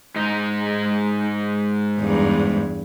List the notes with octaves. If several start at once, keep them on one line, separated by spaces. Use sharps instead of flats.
G#2 D#4
E2 G2